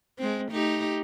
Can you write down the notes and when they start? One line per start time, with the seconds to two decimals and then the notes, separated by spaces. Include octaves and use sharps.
0.19 G#3 C4
0.51 A3 D#4 G4